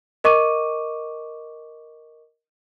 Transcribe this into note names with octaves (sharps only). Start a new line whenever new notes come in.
A#4 D#5 C#6 D6 D#7